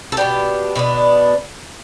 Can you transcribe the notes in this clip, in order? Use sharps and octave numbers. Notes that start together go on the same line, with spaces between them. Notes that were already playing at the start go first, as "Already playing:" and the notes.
A4
B2 B3 D4 G4
B2 B3 D4